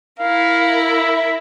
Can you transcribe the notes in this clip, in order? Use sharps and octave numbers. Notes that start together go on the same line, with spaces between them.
E4 A#4 F5
E5